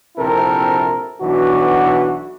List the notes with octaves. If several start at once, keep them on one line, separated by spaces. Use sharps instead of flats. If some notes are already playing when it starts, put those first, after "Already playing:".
A#1 C3 C4 E4 A4 A#4
B1 E3 D4 F#4